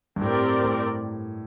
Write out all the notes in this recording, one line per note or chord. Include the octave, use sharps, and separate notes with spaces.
G2
A2 C4 G4 A#4 D5
A2